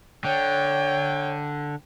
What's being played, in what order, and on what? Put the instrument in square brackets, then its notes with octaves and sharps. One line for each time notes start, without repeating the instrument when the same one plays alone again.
[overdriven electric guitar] D3 [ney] C#5 [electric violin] G5